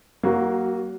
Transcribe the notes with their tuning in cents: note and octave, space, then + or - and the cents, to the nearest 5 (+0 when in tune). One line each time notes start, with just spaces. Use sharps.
F#3 +35 A#3 +0 F#4 +0